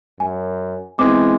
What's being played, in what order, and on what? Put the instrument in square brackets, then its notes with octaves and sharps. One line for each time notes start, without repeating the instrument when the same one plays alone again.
[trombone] F#2 [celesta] G#5
[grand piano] E3 B3 C4 [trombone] G#3 [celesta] D6